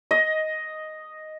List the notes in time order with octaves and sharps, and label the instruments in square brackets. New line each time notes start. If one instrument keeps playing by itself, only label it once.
[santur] D#5